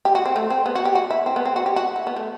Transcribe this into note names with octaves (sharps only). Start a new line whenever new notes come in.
G4
F#4
C4
A3
C4
B3
F#4
G4
F#4
E4
C4
B3
C4
F#4
G4
F#4
E4
B3
A3